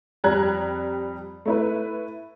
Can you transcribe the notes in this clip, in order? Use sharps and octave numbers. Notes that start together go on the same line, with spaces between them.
F2 G3 A#5 F#6 G#6
A3 E4 B4